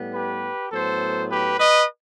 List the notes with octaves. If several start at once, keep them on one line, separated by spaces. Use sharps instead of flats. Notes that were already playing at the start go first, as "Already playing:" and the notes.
Already playing: A2 G3 B3
G4 B4
A2 F#3 B3 A4 C5
G4 B4
B4 D#5